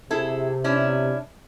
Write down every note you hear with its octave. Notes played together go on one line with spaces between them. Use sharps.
C3 E4 G#4 A4
C#4 D4 E4